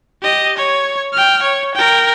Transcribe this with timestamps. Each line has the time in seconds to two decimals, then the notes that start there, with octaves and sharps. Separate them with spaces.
0.22 G4 D#5
0.57 C#5
1.13 G5 F6
1.42 C#5
1.75 A#4 G5